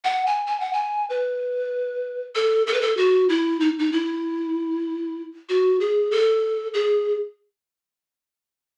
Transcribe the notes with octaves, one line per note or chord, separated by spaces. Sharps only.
F#5
G#5
G#5
F#5
G#5
B4
A4
A4
B4
A4
F#4
E4
D#4
D#4
E4
F#4
G#4
A4
G#4